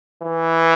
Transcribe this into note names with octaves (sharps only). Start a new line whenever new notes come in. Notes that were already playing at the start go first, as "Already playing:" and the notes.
E3